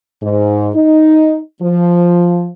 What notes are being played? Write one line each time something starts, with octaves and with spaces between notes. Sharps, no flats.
G#2
D#4
F3